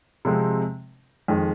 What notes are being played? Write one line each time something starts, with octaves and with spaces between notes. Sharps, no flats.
C3 F3 G#3 C4
F2 D#3 G#3